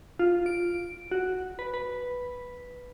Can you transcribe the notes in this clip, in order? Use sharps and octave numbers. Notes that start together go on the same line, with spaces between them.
F4
D7
F#4
B4
B4